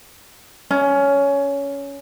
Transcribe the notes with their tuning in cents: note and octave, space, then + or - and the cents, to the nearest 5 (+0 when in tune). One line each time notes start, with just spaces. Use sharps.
C#4 +15